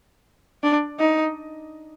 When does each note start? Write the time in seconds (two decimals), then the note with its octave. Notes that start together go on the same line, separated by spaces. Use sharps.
0.63 D4
0.99 D#4